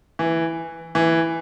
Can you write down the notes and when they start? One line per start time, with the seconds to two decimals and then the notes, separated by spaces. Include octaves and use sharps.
0.19 E3
0.95 E3